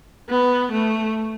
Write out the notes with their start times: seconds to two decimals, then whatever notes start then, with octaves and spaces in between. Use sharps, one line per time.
0.29 B3
0.72 A3